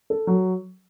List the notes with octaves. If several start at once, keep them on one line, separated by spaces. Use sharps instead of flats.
A4
F#3